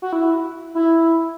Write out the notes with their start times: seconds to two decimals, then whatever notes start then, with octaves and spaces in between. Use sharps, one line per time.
0.02 F#4
0.13 E4
0.75 E4